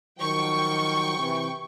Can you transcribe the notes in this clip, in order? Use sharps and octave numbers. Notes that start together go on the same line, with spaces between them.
D#3 F3 F#3 G5 C#6
C3 E3